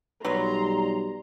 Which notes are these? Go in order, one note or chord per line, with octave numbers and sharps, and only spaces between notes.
B1 F#3 G3 B4 C#5 A#5 C6